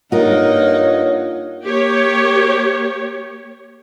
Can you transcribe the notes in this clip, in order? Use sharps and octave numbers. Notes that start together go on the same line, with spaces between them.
G2 A#3 D#4 F4 A#4 C#5 D#5 F#5
A#3 G4 C#5